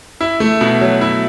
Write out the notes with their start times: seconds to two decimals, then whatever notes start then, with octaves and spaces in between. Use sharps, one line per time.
0.21 E4
0.40 A3
0.61 B2
0.81 F#3
1.01 E4